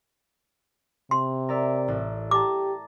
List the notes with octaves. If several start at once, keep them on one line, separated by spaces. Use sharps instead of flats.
C3 C6
A#4 D5 E5
A1
G4 A5 A#5 D6